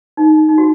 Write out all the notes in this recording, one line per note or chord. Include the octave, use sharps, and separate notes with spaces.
D#4
D#4
F#4